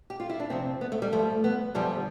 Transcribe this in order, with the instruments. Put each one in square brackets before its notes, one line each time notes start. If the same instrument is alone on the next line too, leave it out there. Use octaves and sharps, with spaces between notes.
[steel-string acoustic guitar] G4
F4
E4
D4
F2 C3 F3 C4
B3
A3
G3
G2 F3 A3
B3
E2 D3 F3 G3